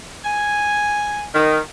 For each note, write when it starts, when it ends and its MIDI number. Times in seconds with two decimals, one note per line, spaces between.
0.25 1.23 80
1.34 1.59 51